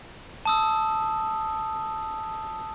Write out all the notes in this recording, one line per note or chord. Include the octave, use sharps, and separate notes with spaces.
A5 D#6 E6